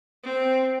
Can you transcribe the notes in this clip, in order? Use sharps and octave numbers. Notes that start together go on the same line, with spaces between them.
C4